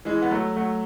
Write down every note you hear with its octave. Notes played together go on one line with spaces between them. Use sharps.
E3 G#3
B3
F#3 A3
F#3 A3